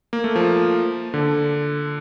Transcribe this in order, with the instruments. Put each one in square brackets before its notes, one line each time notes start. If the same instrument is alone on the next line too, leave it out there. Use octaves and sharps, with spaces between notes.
[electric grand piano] A#3
A3
F3
D3